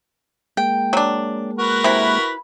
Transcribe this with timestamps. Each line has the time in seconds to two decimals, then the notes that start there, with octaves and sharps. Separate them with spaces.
0.57 G#3 A#3 G5
0.93 F#3 D4
1.59 F#4 A#4 B4
1.84 C3 E4 B5